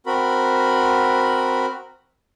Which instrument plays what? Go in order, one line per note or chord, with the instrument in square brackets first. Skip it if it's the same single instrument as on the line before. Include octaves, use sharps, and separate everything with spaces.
[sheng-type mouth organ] C4 F#4 A#4 B5